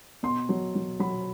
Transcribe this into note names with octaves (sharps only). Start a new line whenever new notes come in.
B2 C6
F#3
F#3
F#3 B5